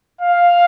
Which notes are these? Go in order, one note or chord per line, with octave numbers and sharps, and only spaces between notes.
F5